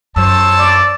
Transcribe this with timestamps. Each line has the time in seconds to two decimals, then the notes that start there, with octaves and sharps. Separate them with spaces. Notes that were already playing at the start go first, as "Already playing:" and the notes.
0.16 F#2 C5 C#5 A5 E6
0.58 D5